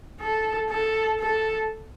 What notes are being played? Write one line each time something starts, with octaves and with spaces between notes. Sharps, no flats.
A4
A4
A4